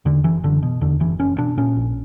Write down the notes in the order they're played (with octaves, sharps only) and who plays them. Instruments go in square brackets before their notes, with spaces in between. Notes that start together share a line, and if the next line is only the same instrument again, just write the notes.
[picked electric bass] E2 D3
F#1 E3
F#1 D3
B2
E2 D3
F#1 E3
F#1 C#4
B2 D4
A#2 C#4
A#1